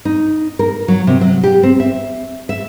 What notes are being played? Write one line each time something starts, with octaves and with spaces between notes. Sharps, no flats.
D#4
A#4
F#3
C3
F#3
G4
C4
E5
E5